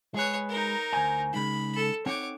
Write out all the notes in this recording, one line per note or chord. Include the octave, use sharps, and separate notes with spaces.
G#3 G#4 B4 C#5
D#4 A#4
D2 C5 G#5
C#3 G#3 D#4 B5
A4
C4 D#4 C#5 F#5 D6